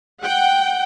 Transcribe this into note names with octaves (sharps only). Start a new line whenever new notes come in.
F#5 G5